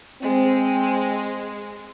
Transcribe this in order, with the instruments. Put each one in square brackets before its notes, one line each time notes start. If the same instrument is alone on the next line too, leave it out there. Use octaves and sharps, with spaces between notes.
[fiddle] G#3 [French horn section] C4